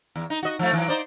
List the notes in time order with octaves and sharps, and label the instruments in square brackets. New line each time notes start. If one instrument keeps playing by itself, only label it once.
[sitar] E2
D#4
F#4 D#5
F3 A3
E3 F#3
D#4 C5 D5